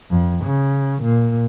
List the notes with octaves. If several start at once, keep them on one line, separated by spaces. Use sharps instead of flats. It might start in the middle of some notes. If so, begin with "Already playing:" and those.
F2
C#3
A#2